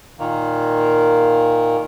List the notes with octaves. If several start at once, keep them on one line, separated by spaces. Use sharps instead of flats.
A#2 D#3 A#3